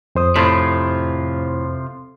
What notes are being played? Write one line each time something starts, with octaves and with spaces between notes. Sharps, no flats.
F2 C5 D#6
A2 C3 F3 F4